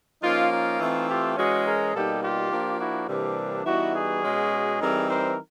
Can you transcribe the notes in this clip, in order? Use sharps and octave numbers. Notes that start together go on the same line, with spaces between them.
F3 A#3 C#4 D#4 F4
D#4 F4
E3 A3 C4
F4 G4
E3 G#3 C#4 F#4 G#4
G#4 A#4
B2 G3 A#3 D#4 G4 A4
F4 G4
F3 A#3 D4
E4 F#4
C3 E3 G3 A#3 D4
E3 G3 B3 D#4 E4 F#4
F#4 G#4
B2 G#3 C#4
E3 G3 C4 D#4 G#4 A#4
A#4 C5